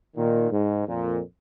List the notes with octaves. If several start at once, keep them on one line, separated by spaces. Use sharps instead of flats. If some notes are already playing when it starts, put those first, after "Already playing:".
A#2 D#3
G#2
F2 A#2